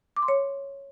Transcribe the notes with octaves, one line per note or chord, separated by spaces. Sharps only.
D6
C6
C#5